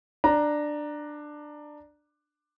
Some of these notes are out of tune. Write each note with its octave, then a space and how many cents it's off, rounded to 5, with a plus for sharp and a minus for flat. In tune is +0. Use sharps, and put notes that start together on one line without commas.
D4 +15 A#5 +0